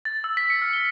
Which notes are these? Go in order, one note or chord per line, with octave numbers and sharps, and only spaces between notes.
A6
E6
B6
C#7
F6
G7